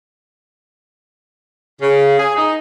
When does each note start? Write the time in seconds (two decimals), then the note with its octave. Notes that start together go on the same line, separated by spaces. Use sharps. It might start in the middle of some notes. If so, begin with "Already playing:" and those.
1.81 C#3
2.19 G#4
2.37 D#4